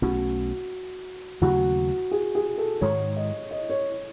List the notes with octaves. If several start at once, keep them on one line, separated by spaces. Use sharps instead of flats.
B1 B2 A3 C#4 F#4
D#2 C#3 F#3 A3 F#4
G#4
G#4
A4
G#2 D#3 G#3 C#5
D#5
D#5
C#5